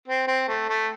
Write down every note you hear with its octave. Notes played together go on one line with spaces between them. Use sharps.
C4
C4
A3
A3